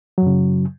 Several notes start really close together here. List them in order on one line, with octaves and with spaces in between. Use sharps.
F#3 F#2 C#3